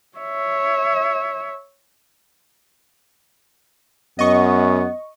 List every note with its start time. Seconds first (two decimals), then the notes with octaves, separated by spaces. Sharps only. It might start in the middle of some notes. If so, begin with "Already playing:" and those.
0.17 C#5 E5
4.19 F#2 B3 D#5 C#6